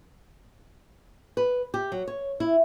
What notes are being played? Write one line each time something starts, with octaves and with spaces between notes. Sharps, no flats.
B4
G4
F#3
C#5
E4